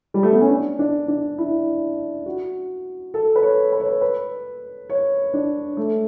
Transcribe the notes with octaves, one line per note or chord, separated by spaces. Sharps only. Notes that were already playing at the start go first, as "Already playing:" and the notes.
G3
A3
B3
C#4
D4
D4
D4
E4
F#4
A4
B4
C#5
B4
C#5
B4
B4
C#5
D4
A3